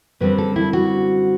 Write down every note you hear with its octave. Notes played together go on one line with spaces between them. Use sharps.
F#2 D3 G3 C4 B4
A4
E4
F#4